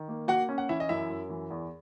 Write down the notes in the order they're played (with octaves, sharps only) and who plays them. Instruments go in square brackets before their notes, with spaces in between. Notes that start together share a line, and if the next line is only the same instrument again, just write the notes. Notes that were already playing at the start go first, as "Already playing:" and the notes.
Already playing: [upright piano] D#3
A#3
[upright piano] A#3 [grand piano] F#4 F#5
[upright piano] C#4
[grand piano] F#5
[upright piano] E3 [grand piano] E4 E5
[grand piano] D#5
[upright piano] F#2 [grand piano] E4 E5
[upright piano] F#2
E3
E2